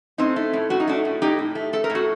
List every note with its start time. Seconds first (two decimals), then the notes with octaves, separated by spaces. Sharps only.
0.18 A2 C4 D#4
0.36 A3
0.53 A2
0.70 A2 F#4
0.80 D#4
0.87 A3 D4 F#4
1.05 A2
1.22 A2 D#4 G4
1.39 A2
1.55 A3
1.73 A3 A4
1.84 A#4
1.90 A2
1.95 F#4 A4